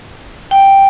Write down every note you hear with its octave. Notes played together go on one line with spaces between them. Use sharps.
G5